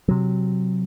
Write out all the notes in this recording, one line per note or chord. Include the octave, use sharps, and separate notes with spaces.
C3 F#3